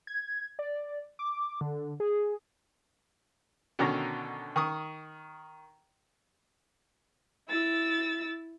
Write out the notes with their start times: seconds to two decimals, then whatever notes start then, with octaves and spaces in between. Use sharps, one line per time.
0.07 G#6
0.59 D5
1.19 D6
1.61 D3
2.00 G#4
3.79 B2 D3 D#3 C#4 A#5
4.56 D#3 C#6 D#6
7.48 E4 E6 A6